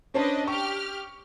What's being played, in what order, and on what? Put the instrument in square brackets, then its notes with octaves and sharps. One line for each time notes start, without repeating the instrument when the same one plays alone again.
[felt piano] C#4 C5 A5 [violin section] D4 B4 D#5
[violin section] G4 F6 [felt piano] C#6